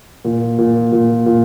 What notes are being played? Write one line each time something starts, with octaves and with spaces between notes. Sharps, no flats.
A#2
A#2
A#2
A#2